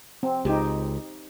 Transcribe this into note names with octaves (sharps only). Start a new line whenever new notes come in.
C4
C#2 D#4 G4